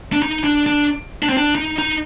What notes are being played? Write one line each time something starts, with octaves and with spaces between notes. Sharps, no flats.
D4
D#4
D4
D4
D4
C4
D4
D#4
D#4